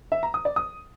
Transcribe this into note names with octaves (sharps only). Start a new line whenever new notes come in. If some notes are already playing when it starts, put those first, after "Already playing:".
E5
A#5
D#6
D5
D#6